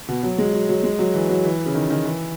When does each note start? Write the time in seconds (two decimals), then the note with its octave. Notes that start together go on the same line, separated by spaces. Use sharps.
0.08 B2
0.23 F#3
0.38 G#3
0.53 F#3
0.69 F#3
0.84 G#3
0.99 F#3
1.14 E3
1.29 F#3
1.45 E3
1.66 C#3
1.75 D#3
1.90 D#3
2.05 E3